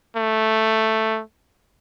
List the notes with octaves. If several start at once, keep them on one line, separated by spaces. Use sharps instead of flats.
A3